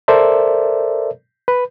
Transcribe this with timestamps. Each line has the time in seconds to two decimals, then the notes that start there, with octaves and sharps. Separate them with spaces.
0.08 A4 A#4 C5 D5 E5
1.48 B4